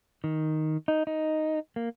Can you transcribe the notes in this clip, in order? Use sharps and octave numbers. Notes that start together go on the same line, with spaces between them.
D#3
D#4
D#4
A#3